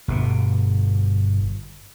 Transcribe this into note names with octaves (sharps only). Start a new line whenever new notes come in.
G1 B2